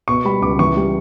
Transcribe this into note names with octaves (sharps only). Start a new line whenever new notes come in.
B2 C#6
G3 B5
C#2 D6
E3 C#6
G3